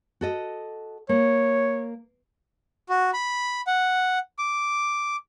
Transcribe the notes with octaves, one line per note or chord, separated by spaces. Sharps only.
F#4 A4 D#5
A#3 C#5
F#4
B5
F#5
D6